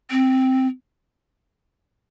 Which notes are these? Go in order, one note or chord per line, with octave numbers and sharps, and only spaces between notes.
C4